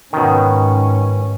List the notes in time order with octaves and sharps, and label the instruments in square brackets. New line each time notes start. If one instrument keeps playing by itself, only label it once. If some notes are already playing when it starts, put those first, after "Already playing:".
[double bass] G#2 C#4 [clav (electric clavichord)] B2 D#3